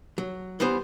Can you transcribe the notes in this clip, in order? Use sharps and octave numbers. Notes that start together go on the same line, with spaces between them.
F#3
E3 G3 B3 C5